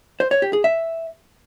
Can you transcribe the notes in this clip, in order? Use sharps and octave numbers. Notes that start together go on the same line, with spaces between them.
C5
C#5
G4
G#4
E5